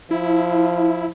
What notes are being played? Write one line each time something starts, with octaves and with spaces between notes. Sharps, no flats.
F3 E4